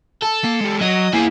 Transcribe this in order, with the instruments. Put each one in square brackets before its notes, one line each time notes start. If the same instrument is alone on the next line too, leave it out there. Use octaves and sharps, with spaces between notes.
[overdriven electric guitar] A4
[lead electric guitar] A#3
G#3 G4
[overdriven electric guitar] F#3 [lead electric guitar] D#5
[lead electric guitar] A#3 [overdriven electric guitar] E4 G#4